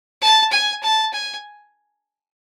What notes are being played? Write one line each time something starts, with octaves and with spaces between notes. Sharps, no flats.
A5
G#5
A5
G#5